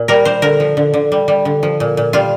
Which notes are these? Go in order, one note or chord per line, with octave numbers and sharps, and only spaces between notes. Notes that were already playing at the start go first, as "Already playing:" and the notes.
Already playing: A#2
G3 A#4
G3 C5
D3 A#4
F3
D3
D3
G3
G3
D3
F3
A#2
A#2
G3 F4